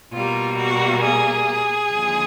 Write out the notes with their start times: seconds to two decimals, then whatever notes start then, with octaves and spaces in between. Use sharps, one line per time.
0.13 B2 G3 A#3 F4
0.57 F#4
1.02 G#4
1.91 D#2 D3 F3 G#3